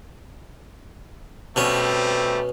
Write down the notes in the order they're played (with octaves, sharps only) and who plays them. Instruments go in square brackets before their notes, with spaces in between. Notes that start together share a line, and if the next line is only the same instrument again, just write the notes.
[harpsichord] B2 C#4 [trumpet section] G3 A3 C4